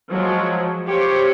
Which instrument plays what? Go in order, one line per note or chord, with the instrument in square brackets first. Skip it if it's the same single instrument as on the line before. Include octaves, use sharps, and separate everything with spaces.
[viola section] F3 F#3 G#3
F4 G4 C5 C#5